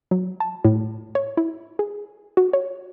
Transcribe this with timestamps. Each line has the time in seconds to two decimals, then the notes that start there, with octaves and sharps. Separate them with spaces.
0.11 F#3
0.40 A5
0.65 A2
1.15 C#5
1.37 E4
1.79 G#4
2.37 F#4
2.53 C#5